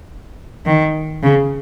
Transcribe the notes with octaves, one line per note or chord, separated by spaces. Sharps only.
D#3
C#3